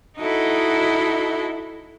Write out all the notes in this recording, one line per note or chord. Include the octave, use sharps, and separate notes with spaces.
D#4 E4 F#4 A4 D#5